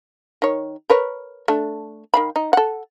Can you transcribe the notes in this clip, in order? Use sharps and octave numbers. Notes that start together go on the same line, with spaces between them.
D#3 C#5
A#4 B4 C#5
A3 D4
D#3 F5 B5
D#4
A4 F#5